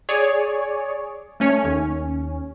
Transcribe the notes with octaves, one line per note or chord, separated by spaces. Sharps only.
G#4 C#5 D5
A3 C#4 C#5
D#2 C#4